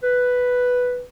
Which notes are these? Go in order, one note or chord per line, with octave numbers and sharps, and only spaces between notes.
B4